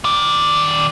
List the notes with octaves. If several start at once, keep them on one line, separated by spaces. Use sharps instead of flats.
D#3 D5